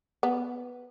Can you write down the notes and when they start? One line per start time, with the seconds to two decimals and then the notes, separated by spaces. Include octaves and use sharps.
0.23 B3